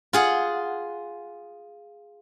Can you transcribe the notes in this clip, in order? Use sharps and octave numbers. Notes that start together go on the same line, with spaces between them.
F4 G#4 F#5